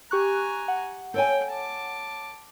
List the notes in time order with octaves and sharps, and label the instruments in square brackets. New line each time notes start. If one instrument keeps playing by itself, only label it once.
[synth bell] G4 C#6 F#6 [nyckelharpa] G#5 A#5
[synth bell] F#5
[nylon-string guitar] A4 C#5 G#5 [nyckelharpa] G5
[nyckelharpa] A5 D6